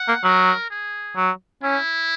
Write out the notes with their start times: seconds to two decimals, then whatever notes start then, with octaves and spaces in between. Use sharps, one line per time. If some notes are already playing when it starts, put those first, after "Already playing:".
Already playing: F#5
0.08 A#3
0.24 F#3 A#4
0.70 G#4
1.17 F#3
1.63 C#4 E4